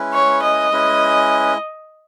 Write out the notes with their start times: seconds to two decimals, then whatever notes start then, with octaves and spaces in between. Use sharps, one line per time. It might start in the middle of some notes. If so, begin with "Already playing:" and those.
Already playing: G#3 C#4 E4 B4
0.14 C#5
0.43 D#5
0.71 G#3 C#4 E4 B4